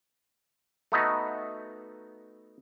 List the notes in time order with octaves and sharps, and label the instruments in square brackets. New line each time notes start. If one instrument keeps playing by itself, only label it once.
[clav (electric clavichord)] A3 B3 D#4 F#4